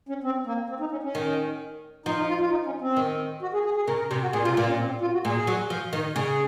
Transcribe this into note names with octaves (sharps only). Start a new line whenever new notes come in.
C#4
C4
A#3
C4
D#4
C#4
C#4
D#3
F3 D#4
D#4
F4
F4
D#4
C#4
C4
D#3
F#4
G#4
G#4
G#4
C#3 A#4
A#4
C3
F#4
A#2 G#4
C3 F4
A#2 F4
C#4
C4
F4
F#4
A#2 G#4
F#3
F3
D#3
C#3 G#4